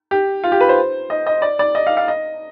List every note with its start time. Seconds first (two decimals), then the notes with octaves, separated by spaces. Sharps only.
0.11 G4
0.44 F4
0.52 G4
0.60 B4
0.69 C5
1.10 D#5
1.27 D#5
1.42 D5
1.59 D5
1.75 D#5
1.87 F5
1.97 F5
2.08 D#5